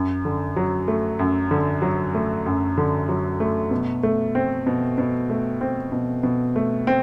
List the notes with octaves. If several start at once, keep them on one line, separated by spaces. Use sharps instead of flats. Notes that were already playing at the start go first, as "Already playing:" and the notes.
Already playing: F#2
D3
F#3
A3
F#2
D3
F#3
A3
F#2
D3
F#3
A3
B2
A3
C4
B2
B2
A3
C4
B2
B2
A3
C4